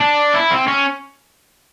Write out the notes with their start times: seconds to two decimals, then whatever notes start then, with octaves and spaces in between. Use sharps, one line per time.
0.01 D4
0.35 E4
0.51 C4
0.68 C#4